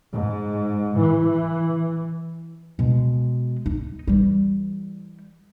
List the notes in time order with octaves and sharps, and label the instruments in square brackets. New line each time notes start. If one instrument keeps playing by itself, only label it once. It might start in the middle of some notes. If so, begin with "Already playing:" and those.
[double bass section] G#2
E3
[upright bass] B2 G#3
D#4
E3 G3